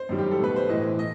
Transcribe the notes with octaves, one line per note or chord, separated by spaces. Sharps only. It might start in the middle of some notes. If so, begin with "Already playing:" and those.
Already playing: C5
F#2 D#3 G3
G4
A4
B2 A3 B4
C5
A2 E3 A3 D#5
D#5